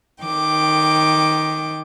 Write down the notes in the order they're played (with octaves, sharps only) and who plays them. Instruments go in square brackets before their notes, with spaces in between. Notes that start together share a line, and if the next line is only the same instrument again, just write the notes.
[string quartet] D#3 G5 D6